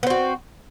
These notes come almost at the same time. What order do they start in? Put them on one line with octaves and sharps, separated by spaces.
B3 C4 F#4